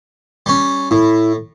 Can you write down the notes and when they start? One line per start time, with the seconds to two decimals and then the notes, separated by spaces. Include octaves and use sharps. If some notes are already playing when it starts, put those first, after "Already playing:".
0.46 G3 C#4
0.91 A2 E4